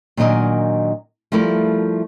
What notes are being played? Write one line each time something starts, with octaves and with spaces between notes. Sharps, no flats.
A#2 D#3 F#3 D4 D#5 G#5
F3 G3 A3 E4 A4 A#4